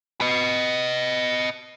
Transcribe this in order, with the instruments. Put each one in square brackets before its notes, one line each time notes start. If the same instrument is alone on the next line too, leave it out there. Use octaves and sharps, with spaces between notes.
[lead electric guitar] B4 D#5